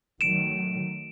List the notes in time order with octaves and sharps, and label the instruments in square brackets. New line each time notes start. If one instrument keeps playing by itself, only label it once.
[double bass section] D#3 F#3 A3 [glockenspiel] D7 E7